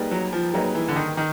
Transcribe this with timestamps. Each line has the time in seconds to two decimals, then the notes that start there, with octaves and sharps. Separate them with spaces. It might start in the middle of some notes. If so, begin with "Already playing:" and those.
Already playing: G3 A#3 D#4 G#4 B4
0.11 F#3
0.33 F3
0.53 F#3 G3 A#3 D#4 G#4 B4
0.75 E3
0.88 D3
0.96 D#3
1.17 D#3